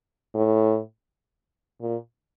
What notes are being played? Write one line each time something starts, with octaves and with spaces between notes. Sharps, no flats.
A2
A#2